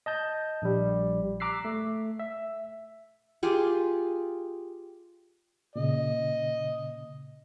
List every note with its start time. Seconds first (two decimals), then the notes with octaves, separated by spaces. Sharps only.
0.06 D#5 A5 G6
0.62 A#1 G3
1.40 A#5 D6 E6 F#6 B6 C7
1.65 A3
2.19 E5
3.43 F4 G4 G#4
5.76 A#2 C#3 D#5